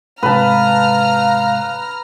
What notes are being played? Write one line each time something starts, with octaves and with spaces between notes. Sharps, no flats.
G#2 C3 G#3 B4 F5 A5 A#5 F6